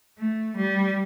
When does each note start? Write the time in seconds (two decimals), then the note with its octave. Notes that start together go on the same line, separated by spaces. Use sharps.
0.18 A3
0.56 G3